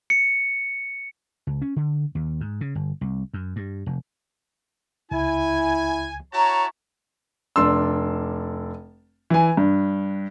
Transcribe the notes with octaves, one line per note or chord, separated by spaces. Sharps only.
C#7
C#2
C#4
D3
D#2
G#2
C#3
G1
C2
F#2
G2
F1
C#2 E4 G#5
E4 F#4 C#5 A5 A#5 C#6
F1 D4 C6 E6
E3 G#5
G2